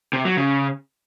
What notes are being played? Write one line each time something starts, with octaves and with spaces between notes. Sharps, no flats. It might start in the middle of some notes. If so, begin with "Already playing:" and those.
C3
F#3
C#3